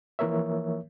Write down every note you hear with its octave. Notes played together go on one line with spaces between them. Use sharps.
E3 F3 A#3 A#4 C#5 E5